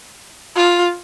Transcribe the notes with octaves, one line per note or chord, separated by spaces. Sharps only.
F4